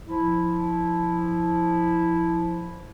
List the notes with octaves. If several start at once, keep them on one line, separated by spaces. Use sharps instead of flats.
F3 E4